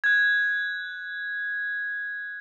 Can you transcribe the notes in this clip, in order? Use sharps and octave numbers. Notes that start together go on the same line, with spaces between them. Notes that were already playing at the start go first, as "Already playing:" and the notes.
F#6 G#6